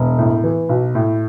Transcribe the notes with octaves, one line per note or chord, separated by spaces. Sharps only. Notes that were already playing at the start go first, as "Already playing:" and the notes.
Already playing: E1
A2
E3
B1
A2